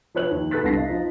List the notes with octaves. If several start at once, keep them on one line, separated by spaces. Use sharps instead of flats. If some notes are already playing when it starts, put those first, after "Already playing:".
F3 B4 C#5 F#6 F#7
D#2
A4 B4 F#6 A6 B6
C2 D3 A#6 C7
D#5 F5
F3 D#4 C5